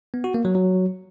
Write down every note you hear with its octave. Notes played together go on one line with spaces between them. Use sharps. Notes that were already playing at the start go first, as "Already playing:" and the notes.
B3
F#4
A#3
F#3
F#3